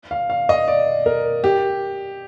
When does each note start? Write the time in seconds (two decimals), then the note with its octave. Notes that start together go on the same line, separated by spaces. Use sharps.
0.11 F5
0.30 F5
0.49 D#5
0.68 D5
1.06 A#4
1.44 G4